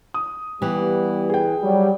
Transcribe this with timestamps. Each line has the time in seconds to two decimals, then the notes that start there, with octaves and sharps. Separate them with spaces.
0.14 D#6
0.62 E3 G3 B3 G4
1.29 G#4 G5
1.63 F#3 G3